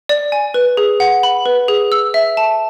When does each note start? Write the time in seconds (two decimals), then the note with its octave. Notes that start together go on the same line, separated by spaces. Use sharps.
0.09 D5
0.32 G#5
0.54 B4
0.77 G#4
1.00 F#5
1.23 B5
1.46 B4
1.68 G#4
1.92 E6
2.14 E5
2.37 A5